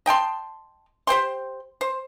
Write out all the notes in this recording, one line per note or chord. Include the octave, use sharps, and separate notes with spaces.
D#5 G5 A5 C6
G4 C5 G5 C6
C5